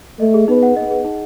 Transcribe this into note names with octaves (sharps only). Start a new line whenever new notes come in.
A3 D#5
G#4
B3 D#4
F#5
B3 D#5
G#4
D#4